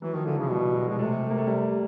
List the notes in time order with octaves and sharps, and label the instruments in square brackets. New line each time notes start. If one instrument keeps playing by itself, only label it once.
[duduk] E3 [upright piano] F#3
[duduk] D#3 [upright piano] F3
[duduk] D3 [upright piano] E3
[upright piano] F3
[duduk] C#3
[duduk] B2 [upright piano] G3
[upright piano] F#3
[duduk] B2 [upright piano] G#3
[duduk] C3 [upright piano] A3
[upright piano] A3
A#3
A3
G3